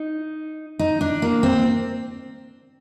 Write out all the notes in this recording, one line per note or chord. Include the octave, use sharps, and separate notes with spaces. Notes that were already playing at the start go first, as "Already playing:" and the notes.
Already playing: D#4
D#4
D4
A#3
C4